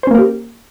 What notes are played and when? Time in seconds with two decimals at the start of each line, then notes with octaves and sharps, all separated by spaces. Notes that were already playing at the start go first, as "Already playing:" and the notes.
0.03 C5
0.07 C#4
0.11 A#3
0.15 A#4
0.19 G4